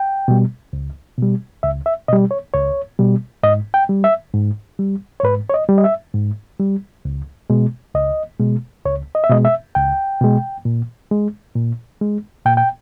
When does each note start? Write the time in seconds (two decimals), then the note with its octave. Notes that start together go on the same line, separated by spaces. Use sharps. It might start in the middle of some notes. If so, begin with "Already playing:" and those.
Already playing: G5
0.28 B2 G3
0.73 C#2
1.18 B2 G3
1.63 C#2 E5
1.86 E5
2.08 B2 G3 D#5
2.31 C#5
2.54 C#2 C#5
2.99 B2 G3
3.43 G#2 D#5
3.74 G5
3.89 G3
4.04 E5
4.34 G#2
4.79 G3
5.20 C#5
5.24 G#2 B4
5.50 C#5
5.54 D#5
5.69 G3
5.78 D#5
5.84 E5
6.14 G#2
6.59 G3
7.05 C#2
7.50 B2 G#3
7.95 C#2 D#5
8.40 B2 G#3
8.85 C#2 C#5
9.15 D#5
9.24 E5
9.30 B2 G#3 D#5
9.45 E5
9.75 C#2 G5
10.21 B2 G#3
10.65 A#2
11.11 G#3
11.55 A#2
12.01 G#3
12.45 A#2 G5
12.57 G5